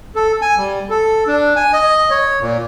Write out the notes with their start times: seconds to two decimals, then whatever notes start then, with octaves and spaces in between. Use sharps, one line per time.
0.15 A4
0.42 G#5
0.58 G3
0.90 A4
1.27 D4
1.56 G#5
1.73 D#5
2.10 C#5
2.41 A#2